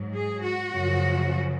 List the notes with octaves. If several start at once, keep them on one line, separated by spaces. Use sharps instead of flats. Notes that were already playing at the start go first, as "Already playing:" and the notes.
Already playing: G#2 F#3
G#4
F#4
F#2 C#3 F3